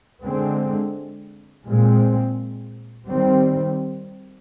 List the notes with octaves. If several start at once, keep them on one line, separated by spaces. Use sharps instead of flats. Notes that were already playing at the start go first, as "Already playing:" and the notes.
D3 G#3 C4
A#2 G#3 C4
D#3 G3 C4